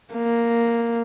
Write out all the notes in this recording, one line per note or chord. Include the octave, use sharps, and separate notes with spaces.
A#3